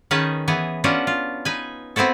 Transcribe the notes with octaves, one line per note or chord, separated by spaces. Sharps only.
D#3 C#4 D#4 G#4 B4 A5
E3 B3 G#4
B3 C#4 D4 F4 F#4
F4
D#4 B4 G#5
B3 C4 E4 F#4 A4